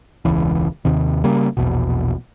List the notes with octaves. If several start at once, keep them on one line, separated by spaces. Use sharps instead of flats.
E1 C#2 E3
D#2 C3 D#3
C#3 G3 A#3
A#1 E2 B2